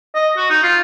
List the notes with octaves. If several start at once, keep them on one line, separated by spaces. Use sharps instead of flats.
D#5
F#4
D#4
F4